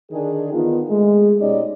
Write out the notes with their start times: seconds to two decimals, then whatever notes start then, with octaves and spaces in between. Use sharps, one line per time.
0.11 D3 D#3 D4 G#4
0.53 D#3 E3 B3 D#4 F4
0.89 G#3 A3
1.39 B2 C#4 D#4 G4 D5 D#5